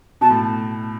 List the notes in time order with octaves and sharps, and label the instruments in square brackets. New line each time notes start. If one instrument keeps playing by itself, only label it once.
[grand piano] B2 [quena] A5
[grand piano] A2